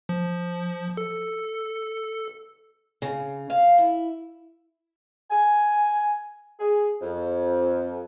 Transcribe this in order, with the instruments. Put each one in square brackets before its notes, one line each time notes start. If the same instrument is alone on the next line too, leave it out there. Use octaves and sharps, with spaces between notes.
[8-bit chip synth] F3
A4
[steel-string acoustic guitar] C#3
F5
E4
[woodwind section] G#5
G#4
F2